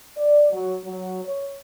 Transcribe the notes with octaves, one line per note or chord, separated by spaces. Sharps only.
D5
F#3
F#3
C#5